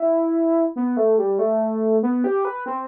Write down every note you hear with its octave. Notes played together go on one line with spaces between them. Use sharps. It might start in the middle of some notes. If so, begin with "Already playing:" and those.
Already playing: E4
B3
A3
G3
A3
B3
G4
B4
C4